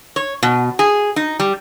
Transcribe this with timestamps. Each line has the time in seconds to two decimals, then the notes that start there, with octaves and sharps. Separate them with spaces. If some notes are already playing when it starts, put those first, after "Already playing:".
0.16 C#5
0.43 B2
0.79 G#4
1.16 D#4
1.40 G3